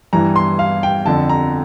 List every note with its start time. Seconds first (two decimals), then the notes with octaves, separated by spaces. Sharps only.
0.13 G2 E3 A#5
0.36 C6
0.59 F5
0.83 G5
1.06 F2 D3 A5
1.29 A#5